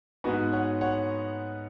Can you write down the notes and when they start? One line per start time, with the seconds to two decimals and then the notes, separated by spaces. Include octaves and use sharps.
0.24 G#2 G#3 B3 D#4 F#4 B4
0.53 C#5 F#5
0.81 C#5 F#5